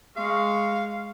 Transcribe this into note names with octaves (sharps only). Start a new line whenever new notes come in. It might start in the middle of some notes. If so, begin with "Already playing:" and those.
G#3 F5 C#6